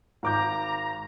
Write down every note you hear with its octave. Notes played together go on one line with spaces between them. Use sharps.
G#1 A#5 D6 G6